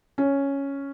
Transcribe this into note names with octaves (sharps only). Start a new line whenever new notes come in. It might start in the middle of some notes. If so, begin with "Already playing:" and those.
C#4